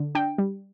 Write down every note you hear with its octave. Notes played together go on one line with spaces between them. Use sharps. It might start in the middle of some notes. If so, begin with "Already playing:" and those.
Already playing: D3
D4 G5
G3